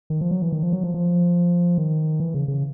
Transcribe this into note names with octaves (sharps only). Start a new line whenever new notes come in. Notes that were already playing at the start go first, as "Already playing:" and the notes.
D#3
F3
F#3
E3
D#3
F3
F#3
F3
F3
D#3
E3
C#3
C#3